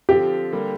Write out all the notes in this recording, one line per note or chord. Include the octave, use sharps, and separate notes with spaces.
D3 F3 C4 F4 G4
D3 G3 A#3